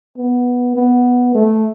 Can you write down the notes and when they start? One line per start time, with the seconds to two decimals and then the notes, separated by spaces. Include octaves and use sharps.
0.17 B3
0.76 B3
1.35 A3